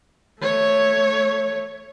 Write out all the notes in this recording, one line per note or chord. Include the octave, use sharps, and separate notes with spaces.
A3 C#5